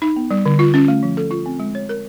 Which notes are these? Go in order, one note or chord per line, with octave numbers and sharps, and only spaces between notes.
D#4
B3
G3
D3
F4
C#4
A3
F3
A4
F4
C4
G#3
C#5
A#4